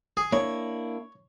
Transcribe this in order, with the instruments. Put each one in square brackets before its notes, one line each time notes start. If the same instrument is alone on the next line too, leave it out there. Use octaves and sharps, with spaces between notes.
[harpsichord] G#4
[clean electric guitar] A#3 D4 E4 [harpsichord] C#5